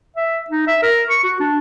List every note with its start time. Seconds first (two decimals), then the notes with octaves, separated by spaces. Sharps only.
0.16 E5
0.50 D#4
0.67 E5
0.83 A#4
1.10 C#6
1.24 F#4
1.40 D4